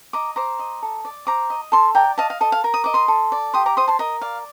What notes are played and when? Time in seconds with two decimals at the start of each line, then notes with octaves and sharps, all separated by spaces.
0.13 D#5 A#5 D6
0.36 C5 A#5 D6
0.59 D#5
0.82 A4
1.05 D5
1.27 C5 A#5 D6
1.50 D#5
1.72 A4 A5 C6
1.95 D5 G5 A#5
2.18 D#5 F5 A5
2.30 F5
2.41 A4 D#5
2.52 F5
2.64 A#4
2.74 D#6
2.84 D#5 D6
2.94 C6 D#6
3.08 A4
3.32 D5
3.54 G4 C6 D#6
3.66 A#5 D6
3.77 C5 C6 D#6
3.88 A5 C6
3.99 A#4 D#5
4.21 D5 F5